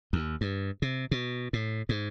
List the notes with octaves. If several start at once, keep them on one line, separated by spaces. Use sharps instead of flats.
D#2
G2
C3
B2
A2
G#2